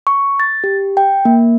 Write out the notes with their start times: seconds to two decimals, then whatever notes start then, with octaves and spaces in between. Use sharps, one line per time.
0.07 C#6
0.40 A6
0.64 G4
0.97 G5
1.25 A#3